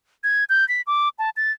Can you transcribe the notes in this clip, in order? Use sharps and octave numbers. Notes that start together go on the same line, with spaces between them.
G#6
G6
B6
D6
A5
A6